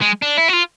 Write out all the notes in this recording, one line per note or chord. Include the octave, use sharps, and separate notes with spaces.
G#3
D4
E4
F#4
F4